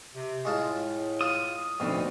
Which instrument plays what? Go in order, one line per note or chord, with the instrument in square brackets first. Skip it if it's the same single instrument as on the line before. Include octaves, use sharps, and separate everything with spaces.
[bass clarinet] C3
[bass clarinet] A2 [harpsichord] G#3 F4 A5
[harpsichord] F4 [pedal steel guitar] D#6
[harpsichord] D2 [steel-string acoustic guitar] B2 C4 D#4 [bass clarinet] F3